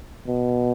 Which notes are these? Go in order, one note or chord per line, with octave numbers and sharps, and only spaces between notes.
B2